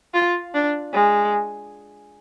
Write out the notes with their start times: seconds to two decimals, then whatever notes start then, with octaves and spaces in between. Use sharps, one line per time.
0.14 F4
0.54 D4
0.93 G#3